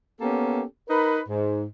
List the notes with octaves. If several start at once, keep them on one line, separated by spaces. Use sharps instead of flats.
A#3 B3 C#4 G4 A4
D#4 A#4 B4
G#2